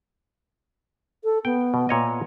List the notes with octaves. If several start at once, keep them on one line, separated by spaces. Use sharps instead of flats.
A4
B3 G5
B2
A#2 C#5 D#5